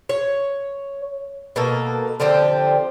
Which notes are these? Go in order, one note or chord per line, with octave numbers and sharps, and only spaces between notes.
C#5
B2 A#3 A4
D3 F3 C4 G4